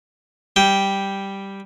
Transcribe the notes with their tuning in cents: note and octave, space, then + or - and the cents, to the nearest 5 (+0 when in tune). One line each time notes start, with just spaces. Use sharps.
G3 +0 G5 +0